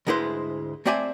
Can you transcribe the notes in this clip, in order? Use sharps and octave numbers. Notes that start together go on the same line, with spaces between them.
D2 G#2 G#3 E4 B4 C5
A3 C4 C5 D5 E5 G#5